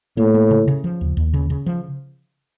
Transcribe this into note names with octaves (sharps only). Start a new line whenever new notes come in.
A2 A#3
A#3
C#3
C#3
F3
D#2
D#2
C#3
C#3
F3